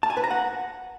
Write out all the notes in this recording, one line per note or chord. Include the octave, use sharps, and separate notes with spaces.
A5
G#5
B4
A#5
F#5